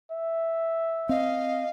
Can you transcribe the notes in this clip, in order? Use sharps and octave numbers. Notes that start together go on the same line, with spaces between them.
E5
C4 D#5 F5